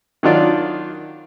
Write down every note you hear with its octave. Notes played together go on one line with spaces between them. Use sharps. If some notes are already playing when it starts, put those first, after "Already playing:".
D#3 F#3 D4 D#4 F4 D5